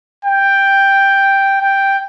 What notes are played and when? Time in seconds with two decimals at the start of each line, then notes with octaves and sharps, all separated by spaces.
0.25 G5
1.62 G5